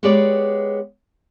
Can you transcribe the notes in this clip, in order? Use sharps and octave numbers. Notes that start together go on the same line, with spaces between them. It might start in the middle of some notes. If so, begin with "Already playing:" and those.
G#3 B3 G4 B4 C#5 D5